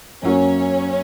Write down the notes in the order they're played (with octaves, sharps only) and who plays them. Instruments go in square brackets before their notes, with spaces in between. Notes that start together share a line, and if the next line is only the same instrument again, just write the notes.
[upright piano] F#2 F#3 A#3 [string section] C#4